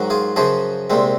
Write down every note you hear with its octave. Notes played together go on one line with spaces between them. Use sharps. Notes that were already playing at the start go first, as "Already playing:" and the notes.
Already playing: G#2 D#3 F#3
F4 G#4
F#2 C#3 F3 G#4 C5
C2 A#2 G#3 C4